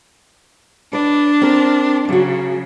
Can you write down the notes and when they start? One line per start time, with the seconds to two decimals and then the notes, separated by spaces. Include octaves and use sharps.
0.93 D4 B4 D5
1.41 C4 A#4
2.09 C#3 F#3 F#4